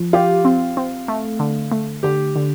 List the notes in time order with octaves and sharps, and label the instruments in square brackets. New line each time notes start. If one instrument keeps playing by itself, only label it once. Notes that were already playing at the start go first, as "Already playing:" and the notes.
Already playing: [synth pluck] F3
[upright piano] F4 [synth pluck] G4
[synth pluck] C4
C4
A3
D3
A3
[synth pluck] D3 [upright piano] G4
[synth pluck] D3